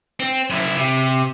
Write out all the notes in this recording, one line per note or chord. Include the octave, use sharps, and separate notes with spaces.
C4
F#2 E4
C3